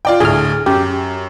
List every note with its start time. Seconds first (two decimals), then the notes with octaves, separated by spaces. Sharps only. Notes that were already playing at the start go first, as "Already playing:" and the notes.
0.05 F4 D5 G5
0.20 D2 A2 G#4 F6
0.66 F#2 G4